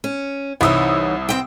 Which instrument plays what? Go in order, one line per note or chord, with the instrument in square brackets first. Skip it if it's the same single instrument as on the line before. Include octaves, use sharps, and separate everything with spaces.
[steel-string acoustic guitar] C#4
[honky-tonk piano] C2 D#6 E6 [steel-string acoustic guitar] E3 D#4 C#5
[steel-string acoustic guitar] B2 C4 G5